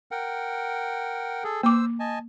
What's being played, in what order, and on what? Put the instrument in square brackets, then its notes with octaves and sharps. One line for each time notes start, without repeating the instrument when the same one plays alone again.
[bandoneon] A#4 F#5 G5
G#4 A4
[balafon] A#3 D6 [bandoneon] C5 E6
[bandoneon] D#5 G#5 A5